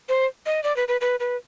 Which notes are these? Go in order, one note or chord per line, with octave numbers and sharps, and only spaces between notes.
C5
D#5
D5
B4
B4
B4
B4